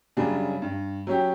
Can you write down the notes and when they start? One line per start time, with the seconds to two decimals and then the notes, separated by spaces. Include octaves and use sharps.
0.17 F#2 C#3 G3 D4
0.62 G2
1.07 F#3 C#4 G4